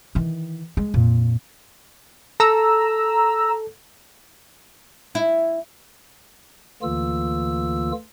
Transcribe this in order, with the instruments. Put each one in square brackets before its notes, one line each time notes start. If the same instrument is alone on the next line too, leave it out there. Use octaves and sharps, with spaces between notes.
[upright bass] D#3 E3
G#3
F2 A#2
[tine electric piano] A4 [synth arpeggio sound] A#5 E6
[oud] E4
[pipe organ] D2 D3 E3 A#3 F4 E6